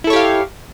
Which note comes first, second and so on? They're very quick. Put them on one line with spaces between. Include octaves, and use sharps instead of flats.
E4 A4 C#5 G4 F5